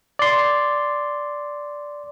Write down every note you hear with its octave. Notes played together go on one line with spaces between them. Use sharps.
D5 C6